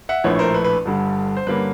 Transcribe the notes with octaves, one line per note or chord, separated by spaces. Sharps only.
E5 F#5
A#1 A2 F3 A3 D4 B4 C#5
A#4 C5
B4
B4
G1 G2 D3 G3
C5
G2 D3 G3 A#3 C#4 B4